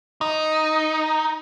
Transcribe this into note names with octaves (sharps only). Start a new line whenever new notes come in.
D#4